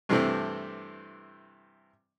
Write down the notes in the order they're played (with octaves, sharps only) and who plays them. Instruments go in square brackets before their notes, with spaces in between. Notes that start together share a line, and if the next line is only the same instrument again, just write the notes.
[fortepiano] G2 C3 E3 A3 C4 E4